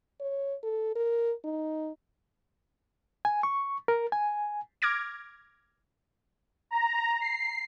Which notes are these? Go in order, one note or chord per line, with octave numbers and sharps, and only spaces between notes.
C#5
A4
A#4
D#4
G#5
C#6
A#4
G#5
D6 F6 G#6 A#6 D7
A#5
C7